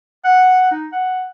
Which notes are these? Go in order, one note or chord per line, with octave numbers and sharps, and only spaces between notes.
F#5
D#4
F#5